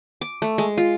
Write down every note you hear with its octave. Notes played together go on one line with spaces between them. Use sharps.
D6
A3
G#3
F4